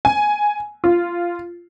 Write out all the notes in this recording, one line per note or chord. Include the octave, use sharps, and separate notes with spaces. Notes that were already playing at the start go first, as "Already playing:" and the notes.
G#5
F4